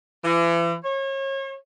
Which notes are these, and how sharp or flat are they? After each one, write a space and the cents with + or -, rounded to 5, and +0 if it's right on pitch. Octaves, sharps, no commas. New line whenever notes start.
E3 +40
C#5 -35